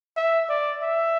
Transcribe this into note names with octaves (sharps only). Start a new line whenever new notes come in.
E5
D5
E5